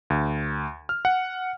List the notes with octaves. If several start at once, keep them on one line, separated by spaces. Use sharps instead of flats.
D2
F6
F#5